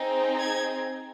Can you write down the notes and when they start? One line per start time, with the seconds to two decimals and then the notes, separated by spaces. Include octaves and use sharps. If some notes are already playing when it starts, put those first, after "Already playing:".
Already playing: C4 D#4 G#4
0.40 G#6